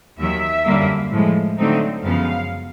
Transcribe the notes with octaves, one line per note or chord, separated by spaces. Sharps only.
D#2 D#3 F#3 E5
F#2 D3 G3 A#3
A2 F3 G#3
D3 F#3 A3 C4 D#4
F#2 C#3 F3 G#3 B3 F5